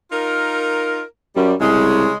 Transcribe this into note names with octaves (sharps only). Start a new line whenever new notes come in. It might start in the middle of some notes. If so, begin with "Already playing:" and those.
D#4 F4 A#4
F#2 G3
C2 C#3 G#3